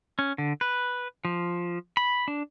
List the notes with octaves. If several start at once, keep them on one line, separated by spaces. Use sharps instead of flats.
C#4
D3
B4
F3
B5
D4